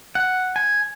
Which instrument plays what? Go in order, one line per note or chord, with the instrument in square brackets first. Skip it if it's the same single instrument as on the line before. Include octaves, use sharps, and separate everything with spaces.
[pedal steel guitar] F#5
G#5